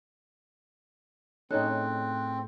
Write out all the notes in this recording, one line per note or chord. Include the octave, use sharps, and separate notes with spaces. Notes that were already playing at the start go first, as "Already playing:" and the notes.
A2 C4 C#4 D#4 G#4 A4 F#6